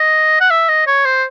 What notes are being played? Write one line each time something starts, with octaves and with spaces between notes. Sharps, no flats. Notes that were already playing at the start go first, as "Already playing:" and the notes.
Already playing: D#5
F#5
E5
D#5
C#5
C5